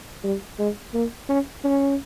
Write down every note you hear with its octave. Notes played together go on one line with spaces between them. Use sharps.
G3
G#3
A#3
C#4
C#4